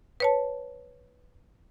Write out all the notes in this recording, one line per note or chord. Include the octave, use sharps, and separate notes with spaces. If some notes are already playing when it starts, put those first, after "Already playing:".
B4 C#5 A5